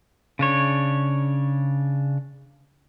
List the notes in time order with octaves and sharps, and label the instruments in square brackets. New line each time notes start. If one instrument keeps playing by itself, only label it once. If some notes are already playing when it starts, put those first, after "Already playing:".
[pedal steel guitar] C#3 D4 C#5